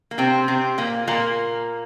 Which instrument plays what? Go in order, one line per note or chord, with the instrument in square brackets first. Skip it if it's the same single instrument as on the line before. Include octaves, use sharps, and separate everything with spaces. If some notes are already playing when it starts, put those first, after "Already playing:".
[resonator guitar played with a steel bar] A#3
C3 C4
C3 C4
A#2 A#3
A#2 A#3